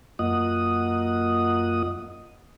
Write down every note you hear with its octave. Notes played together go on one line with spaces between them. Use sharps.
F#2 A#3 F4 D#5 F#5 D#6